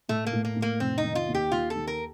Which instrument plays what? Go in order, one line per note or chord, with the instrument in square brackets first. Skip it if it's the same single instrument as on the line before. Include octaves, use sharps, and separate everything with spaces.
[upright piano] A2 [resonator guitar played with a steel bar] A3
[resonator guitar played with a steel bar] A#3
[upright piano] A2
[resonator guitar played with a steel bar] A#3
[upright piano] A2
[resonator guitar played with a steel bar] A#3
[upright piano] F1 [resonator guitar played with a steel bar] C4
[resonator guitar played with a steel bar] D#4
[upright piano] D#3
[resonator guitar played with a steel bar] F4
[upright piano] D#2
[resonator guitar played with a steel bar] G4
[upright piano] D#2 [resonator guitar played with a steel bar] F4
[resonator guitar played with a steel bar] A4
[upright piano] D#3
[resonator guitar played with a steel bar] A#4